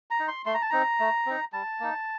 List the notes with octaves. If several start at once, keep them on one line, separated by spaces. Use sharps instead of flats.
A#5
D#4
C6
A3 C6
A#5
A5
C4 D#4 A#5
A3
C4 D#4
G3 A5
A#3 D#4